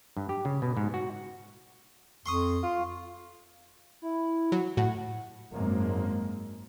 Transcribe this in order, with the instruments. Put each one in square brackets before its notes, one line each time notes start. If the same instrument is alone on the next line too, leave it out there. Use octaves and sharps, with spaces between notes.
[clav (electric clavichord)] G2
G4
C#3
B2
G#2
F#4
[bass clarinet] F2 [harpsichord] C6 C#6 D#6
[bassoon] F4
[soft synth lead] E4
[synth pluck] F#3
[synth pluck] A2 F#4 [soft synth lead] F#5
[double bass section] G#1 F#2 G#3 A#3 C4